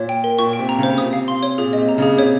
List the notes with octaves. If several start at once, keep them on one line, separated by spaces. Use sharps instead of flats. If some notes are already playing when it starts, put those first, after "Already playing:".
Already playing: A#2 C#5
G5
A#4
A#2 C#6
G5
C3
A#5
C#3
C5
C3 D#6
F5
C6
C#5
A#2 G#4
D#5
C3
A#5
C#3
G#4
C3 C#5